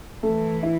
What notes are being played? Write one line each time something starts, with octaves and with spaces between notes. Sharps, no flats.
E3 A3
E4